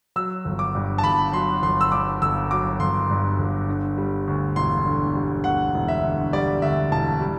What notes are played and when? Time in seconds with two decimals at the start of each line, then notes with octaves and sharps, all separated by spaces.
0.16 F#3 E6
0.45 G1
0.59 D6
0.75 G2
0.98 A5
1.03 G1 B5
1.33 F#3 C6
1.62 G1 C6
1.81 E6
1.91 G2 D6
2.22 G1 E6
2.50 F#3 D6
2.80 G1 C6
3.10 G2
3.39 G1
3.68 D3
3.97 G3
4.28 D2
4.56 E1 C6
4.86 D3
5.15 G3
5.44 D2 F#5
5.74 E1
5.88 E5
6.04 D3
6.33 G3 D5
6.62 D2 E5
6.91 E1 A5
7.21 G3